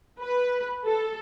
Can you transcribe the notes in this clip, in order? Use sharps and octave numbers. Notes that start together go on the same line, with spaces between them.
B4
A4